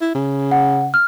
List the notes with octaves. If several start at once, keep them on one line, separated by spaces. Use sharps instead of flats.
E4
C#3
F#5
F6